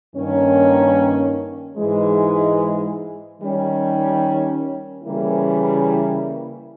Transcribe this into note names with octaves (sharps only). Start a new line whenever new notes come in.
G2 D#3 A#3 C#4
G#2 E3 G#3
D#3 G3 C#4
C#3 E3 G3 A#3 E4